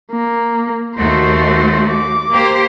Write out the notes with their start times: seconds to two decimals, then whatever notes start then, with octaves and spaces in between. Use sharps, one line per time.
0.12 A#3
0.97 D#2 A3 F#4 C5
1.90 D6
2.33 A#3 G4 C5